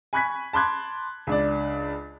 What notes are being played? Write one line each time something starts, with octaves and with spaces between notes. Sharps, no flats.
G#5 B5 C#6 F#6 G#6 B6
A5 B5 C6 D6 F#6 G#6
C#2 D4 D5